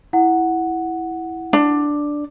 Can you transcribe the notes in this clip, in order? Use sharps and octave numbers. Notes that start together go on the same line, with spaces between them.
E4 F#5
D4